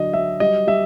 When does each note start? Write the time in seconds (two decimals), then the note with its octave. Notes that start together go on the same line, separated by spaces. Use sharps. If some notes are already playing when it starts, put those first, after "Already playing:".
Already playing: D3 F#3 D4 D#5
0.13 F#3 E5
0.40 G3 D#5
0.67 G3 E5